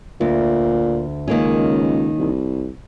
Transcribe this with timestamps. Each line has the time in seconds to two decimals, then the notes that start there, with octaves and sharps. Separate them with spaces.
0.21 D2 A#2
1.28 C#2 D#3 A#3 C#4
2.18 C2